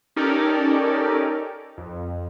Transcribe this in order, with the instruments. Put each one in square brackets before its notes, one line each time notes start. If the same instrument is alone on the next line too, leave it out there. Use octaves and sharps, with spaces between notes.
[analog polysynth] C#4 D#4 G4 A4 A#4 D5
F2